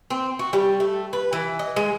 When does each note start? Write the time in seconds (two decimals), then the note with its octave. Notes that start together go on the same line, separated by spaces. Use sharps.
0.10 C4
0.39 F#4
0.53 G3
0.80 A3
1.13 B4
1.33 E3
1.59 D#5
1.76 G#3